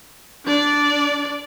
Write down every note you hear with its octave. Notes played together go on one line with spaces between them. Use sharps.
D4 D5